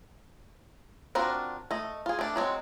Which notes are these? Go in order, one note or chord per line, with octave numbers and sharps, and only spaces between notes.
C4 D4 F4 F#4 A#4
A3 D#5
F4 G#4
A3 D4
F#3 G#3 C4